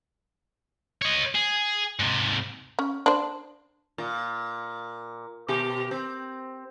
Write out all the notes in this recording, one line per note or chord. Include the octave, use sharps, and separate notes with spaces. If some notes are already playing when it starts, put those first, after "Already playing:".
C#5 D#5
G#4
G#2 C3
C#4
D4 C5
A#2
B2 G4
C4